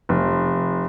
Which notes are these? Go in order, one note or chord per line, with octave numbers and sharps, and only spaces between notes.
F1